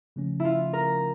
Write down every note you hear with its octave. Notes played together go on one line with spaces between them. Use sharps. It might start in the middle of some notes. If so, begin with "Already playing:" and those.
C#3 F3 A3 C#4
E4 F4
A#4